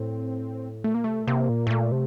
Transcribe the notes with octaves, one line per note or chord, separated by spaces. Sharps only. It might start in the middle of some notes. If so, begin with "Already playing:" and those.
Already playing: A2 C4
A#2 A3
A#3
C3 A3
A#2
C3 A#3
A#2
A2
A#2 A3
C3